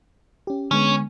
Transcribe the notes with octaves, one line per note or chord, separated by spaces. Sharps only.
C#4 G4
D3 G#3 B3 C#4